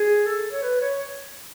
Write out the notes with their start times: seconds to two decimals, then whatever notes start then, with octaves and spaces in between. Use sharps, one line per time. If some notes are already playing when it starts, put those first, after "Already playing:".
Already playing: G#4
0.26 A4
0.52 C#5
0.62 B4
0.81 C#5